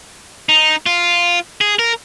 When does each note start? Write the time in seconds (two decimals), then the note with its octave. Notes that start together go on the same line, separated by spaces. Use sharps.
0.49 D#4
0.86 F4
1.61 G#4
1.79 A#4